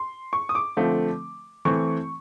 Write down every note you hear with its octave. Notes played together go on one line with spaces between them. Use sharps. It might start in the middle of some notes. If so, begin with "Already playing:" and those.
Already playing: C6
C#6
D#6
D6
D3 F3 A3 C4
E3 A3 C4 C#6